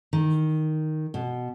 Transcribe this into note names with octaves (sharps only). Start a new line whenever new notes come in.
D#3
B2